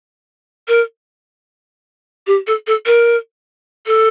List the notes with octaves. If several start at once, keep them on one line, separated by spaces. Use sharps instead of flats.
A#4
G4
A4
A4
A#4
A4